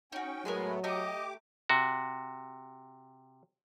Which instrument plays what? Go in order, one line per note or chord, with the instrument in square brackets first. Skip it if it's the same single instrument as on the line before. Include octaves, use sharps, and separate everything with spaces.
[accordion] C#4 G5 [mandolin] D#4 F#4
[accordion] A2 A3 B3 [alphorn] F#3 [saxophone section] G#3 [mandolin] A#4 B4 G#5
[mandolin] A3 A#5 [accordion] G4 D6 [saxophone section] D#5
[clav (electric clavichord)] C3 F#4